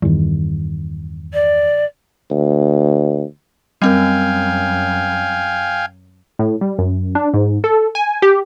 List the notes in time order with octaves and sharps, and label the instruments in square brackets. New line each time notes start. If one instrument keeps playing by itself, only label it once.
[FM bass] E2 [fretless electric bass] G2 D#3
[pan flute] D5
[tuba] D2
[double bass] F#2 [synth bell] G3 C4 A#4 [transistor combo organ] F5 G5 G#5
[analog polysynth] A2
G3
F#2
D4
G#2
A4
G#5
G4